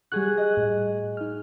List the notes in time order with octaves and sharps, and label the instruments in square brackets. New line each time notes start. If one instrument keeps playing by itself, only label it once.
[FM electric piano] G3 F#6 [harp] F#4 G#4
[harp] D#5
[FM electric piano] A2
D#4 F6